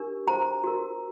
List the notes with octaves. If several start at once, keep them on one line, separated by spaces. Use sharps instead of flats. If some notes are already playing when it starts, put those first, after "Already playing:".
Already playing: D4 G4 A#4
F#4 C5 A#5
F#4 A#4